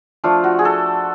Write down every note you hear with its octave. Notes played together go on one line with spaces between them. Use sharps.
F3 A3 D4 F4
F#4
G#4
A4